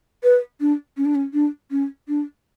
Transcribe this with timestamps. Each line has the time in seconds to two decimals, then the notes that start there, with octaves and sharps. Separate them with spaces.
0.24 B4
0.61 D4
0.97 C#4
1.05 D4
1.15 C#4
1.33 D4
1.71 C#4
2.08 D4